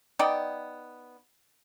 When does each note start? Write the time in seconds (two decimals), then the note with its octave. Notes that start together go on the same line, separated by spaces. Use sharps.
0.19 B3 D#4 D5 G5